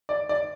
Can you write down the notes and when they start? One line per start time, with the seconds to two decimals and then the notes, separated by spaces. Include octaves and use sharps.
0.09 D5
0.29 D5